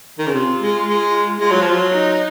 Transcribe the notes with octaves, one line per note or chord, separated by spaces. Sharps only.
D#3
C#3
C3 F4
G#3
G#3
G#3 F4
F#3
F3
F#3
D#4